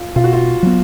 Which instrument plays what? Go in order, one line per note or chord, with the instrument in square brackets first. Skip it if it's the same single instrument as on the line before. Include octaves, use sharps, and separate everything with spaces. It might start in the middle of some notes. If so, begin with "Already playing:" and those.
Already playing: [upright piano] F4
[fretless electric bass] B2 [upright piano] F4
[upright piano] F#4
F4
[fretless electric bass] F#3 B3